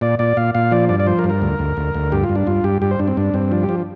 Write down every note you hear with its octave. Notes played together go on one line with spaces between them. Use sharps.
A#2 D5
A#2 D5
A#2 F5
A#2 F5
F3 D5
G2 D5
D5
F3 C5
A#4
G2
A#4
D2
D2
D2
D2
G2 G4
F4
G2
D4
G2 F4
G2 G4
G2 G4
C5
G2 D4
C4
G2 D4
G2 C4
F3 D4
G4
F3